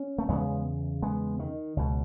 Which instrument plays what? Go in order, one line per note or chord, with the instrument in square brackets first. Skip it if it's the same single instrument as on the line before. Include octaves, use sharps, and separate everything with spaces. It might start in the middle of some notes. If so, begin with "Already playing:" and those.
Already playing: [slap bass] C#4
A3
E2 C#3 G#3 B3
G#3 B3
D#3
C#2 B2